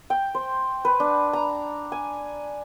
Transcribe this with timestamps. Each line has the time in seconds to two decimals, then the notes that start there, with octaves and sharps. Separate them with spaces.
0.10 G5
0.35 C5
0.85 B4
1.00 D4
1.33 A#5
1.92 G#5